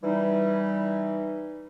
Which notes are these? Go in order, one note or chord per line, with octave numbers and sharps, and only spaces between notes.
E3 G3 D#4